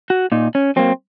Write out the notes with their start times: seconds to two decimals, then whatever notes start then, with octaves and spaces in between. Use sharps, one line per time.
0.10 F#4
0.32 A#2 D#4
0.55 C#4
0.76 F#3 A#3 C4